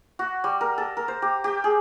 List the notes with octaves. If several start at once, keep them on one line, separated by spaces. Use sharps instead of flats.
F#4
G3
A#4
A4
A#4
C5
G4
G4
G#4